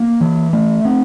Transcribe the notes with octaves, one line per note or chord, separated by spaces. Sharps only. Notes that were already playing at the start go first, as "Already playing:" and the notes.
Already playing: A#3
E3
A3
C4